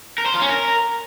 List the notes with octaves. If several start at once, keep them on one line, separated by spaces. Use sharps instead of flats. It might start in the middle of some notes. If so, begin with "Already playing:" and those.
A#4
C5
F4
C#4
A#4